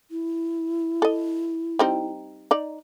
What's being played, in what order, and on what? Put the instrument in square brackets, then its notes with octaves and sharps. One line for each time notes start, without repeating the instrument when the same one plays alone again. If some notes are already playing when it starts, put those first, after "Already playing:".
[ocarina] E4
[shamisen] A4 D#5
G3 C4 D#4
D#4 D5